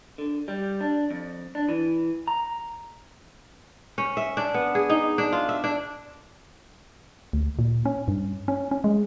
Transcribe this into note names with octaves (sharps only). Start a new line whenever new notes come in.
D3
G3
D4
F2
D4
E3
A#5
C#4
E5
D4
B3
G#4
D#4
D4
F4
E5
D4
D2
A#2
C#4
G2
C#4
C#4
G#3